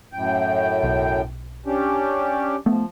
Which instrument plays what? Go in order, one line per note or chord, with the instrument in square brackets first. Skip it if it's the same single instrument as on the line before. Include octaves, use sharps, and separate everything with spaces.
[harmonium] F#2 A2 G5
[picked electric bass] B1
[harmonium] C#4 D4 G4
[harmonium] F3 [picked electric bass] A3 B3